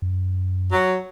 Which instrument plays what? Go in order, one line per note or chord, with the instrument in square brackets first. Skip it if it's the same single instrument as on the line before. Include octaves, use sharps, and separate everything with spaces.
[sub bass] F#2
[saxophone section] F#3